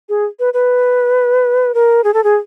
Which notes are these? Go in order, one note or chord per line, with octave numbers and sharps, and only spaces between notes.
G#4
B4
B4
A#4
G#4
A4
G#4